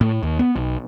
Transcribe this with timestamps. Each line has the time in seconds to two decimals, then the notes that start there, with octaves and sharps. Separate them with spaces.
0.01 A2
0.23 D#2
0.39 B3
0.56 B1